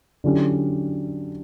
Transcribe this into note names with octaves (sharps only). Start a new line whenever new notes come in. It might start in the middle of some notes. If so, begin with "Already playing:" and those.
D3 F#3 C#4 E4 G4